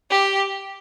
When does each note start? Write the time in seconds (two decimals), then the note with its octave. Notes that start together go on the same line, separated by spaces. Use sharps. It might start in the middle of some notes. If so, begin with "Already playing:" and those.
0.10 G4